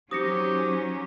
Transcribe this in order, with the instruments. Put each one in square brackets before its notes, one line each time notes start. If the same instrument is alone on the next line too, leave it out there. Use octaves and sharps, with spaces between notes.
[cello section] F#3 C#4 [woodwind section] D#4 C5 [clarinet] G4 [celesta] D#6 A#6 C#7